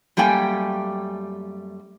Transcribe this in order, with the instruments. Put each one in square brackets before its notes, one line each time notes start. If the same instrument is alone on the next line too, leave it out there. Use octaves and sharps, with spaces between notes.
[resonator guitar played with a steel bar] F#2 G3 A3 A#3 G5 G#5